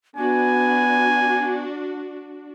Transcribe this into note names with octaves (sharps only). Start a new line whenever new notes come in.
B3 D4 F#4 G#5